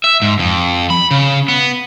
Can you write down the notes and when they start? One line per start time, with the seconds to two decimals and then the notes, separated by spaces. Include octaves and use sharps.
0.04 E5
0.22 G#2
0.39 F2
0.90 B5
1.11 C#3
1.48 B3